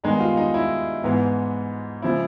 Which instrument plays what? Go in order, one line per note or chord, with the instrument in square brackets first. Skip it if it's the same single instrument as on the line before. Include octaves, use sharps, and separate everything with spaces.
[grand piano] G2 D#3 G#3 B3 D#4
F4
D#4
E4
G#2 E3 G#3 B3
C#3 F3 G#3 E4